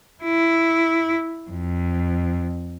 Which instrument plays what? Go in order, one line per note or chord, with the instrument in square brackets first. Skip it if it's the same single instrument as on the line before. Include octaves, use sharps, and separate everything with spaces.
[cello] E4
F2